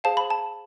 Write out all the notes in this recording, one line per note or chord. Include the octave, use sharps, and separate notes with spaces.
G#4 C5 F5 A5
B5
A5